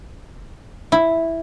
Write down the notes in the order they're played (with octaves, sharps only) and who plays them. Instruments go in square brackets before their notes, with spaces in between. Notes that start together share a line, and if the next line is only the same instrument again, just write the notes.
[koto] E4